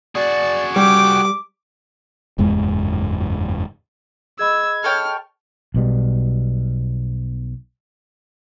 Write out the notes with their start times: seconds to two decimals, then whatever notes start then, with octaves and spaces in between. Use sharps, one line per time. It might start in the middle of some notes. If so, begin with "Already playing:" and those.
0.15 F#4 G#4 D5
0.76 G3 G5 D6
2.38 F#1 E2 G#2 G#3
4.39 G#4 D#5 B5 E6 G#6
4.84 A4 C#5 G5 F6
5.74 B1 B2 G3